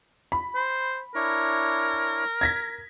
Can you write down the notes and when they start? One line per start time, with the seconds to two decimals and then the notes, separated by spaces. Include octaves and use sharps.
0.32 B5
0.55 C5
1.15 D4 E4 A#4 C#5
2.41 G#6 A#6 B6